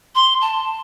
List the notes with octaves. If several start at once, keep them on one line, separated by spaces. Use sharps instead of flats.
C6
A5